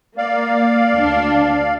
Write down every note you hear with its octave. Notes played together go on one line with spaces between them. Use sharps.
A#3 D5 F5
D2 D4